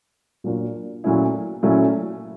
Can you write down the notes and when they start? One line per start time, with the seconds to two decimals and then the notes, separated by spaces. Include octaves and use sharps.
0.44 A#2 F#3 A#3 D4 F4
1.04 A#2 F#3 A3 C#4 E4
1.63 A#2 F#3 A3 C#4 E4